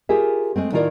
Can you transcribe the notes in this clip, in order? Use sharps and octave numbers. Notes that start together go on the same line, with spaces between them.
F4 G4 G#4 A#4 E5
G#3 A3 C4
A2 D#3 E4 F4 A#4 D5